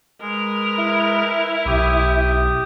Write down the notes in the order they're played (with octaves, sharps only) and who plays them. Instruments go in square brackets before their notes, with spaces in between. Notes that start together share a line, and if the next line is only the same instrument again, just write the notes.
[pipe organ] G#3 [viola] A#4 B4
[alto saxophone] E4
[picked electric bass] B1 [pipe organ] G4 D#6